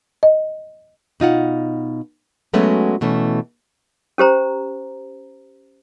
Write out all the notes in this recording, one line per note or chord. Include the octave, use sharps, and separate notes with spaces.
D#5
B2 D#4 F4 F#5
F#3 G#3 A3 B3 C#4 F#4
B2 E3 A3 B3 C#4
C#4 G4 C5 A#5